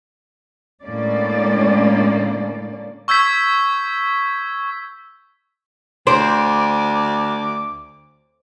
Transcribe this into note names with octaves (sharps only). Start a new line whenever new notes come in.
A2 D3 G#3 A#3 C#4 D5
C#6 E6 G6 G#6 B6
D2 C5 D6